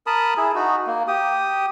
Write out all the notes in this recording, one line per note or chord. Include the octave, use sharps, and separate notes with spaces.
A#4 A5 B5 D#6
E4 G#4
D#4 F#4
A#3
G4 D#6